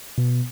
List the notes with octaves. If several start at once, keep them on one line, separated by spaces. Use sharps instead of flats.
B2